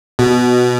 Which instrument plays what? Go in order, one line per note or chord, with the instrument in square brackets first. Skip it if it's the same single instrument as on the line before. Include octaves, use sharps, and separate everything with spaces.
[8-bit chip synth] B2